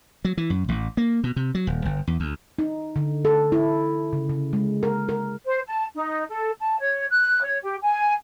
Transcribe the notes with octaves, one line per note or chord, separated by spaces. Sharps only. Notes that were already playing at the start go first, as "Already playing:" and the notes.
F#3
E3
F#2
A1
A#3
B2
C3
F#3
D#1
G1
E2
D2
D#4
D3
A4
E4
C#3
C#3
G#3
A#4
A#4
C5
A5
D#4
A4
A5
C#5
F#6
C#5
G4
G#5